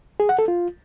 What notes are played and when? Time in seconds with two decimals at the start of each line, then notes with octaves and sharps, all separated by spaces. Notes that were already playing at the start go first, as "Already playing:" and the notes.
0.20 G#4
0.29 F#5
0.39 A4
0.48 F4